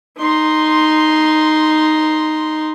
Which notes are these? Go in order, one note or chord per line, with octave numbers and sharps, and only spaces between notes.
D#4 C6